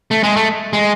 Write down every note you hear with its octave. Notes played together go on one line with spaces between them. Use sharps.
A3
G#3
A3
G#3